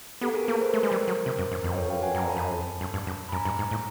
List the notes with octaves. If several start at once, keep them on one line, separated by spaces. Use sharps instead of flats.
B3 G4 A4
G#4 A#4
A#3 A4 B4
A#4 C5
A3
G#3
G3
F#3
C3
F#2
F#2
F2
F#2
F2 B4 C#5
F#2
F2 F5 G5
F#2 F#5 G#5
F2
F#2 G#5 A#5
F2
F#2 A5 B5
F2
F#2
F2
F#2
G2
F#2
B5
F#2 G#5 A#5
G2
G#2
A2